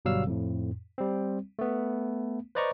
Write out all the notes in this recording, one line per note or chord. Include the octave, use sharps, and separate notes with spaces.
G1 B2 F#3 G3 F5 E6
F2 A2
G3 C4
A3 B3
B4 C5 D5 D#5 A#5 C#6